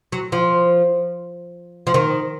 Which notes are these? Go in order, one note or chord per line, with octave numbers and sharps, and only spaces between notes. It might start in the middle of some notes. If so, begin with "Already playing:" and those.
F#3
F3
F3
D#3